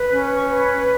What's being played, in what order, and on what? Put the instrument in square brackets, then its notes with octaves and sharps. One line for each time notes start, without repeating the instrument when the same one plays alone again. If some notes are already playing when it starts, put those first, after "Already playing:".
Already playing: [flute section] B4
C#4 B5
C#6
B4
B5